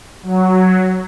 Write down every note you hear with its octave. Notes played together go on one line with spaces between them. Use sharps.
F#3